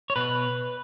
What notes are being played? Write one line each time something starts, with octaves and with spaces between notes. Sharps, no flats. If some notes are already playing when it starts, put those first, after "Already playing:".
C#5
B2 B4